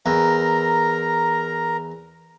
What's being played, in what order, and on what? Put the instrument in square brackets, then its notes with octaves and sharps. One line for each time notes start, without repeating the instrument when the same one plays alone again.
[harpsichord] E2 [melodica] A#4 A#5